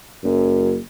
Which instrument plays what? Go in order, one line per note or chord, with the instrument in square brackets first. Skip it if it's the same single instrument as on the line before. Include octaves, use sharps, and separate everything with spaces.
[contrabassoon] F#1 [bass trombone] F#2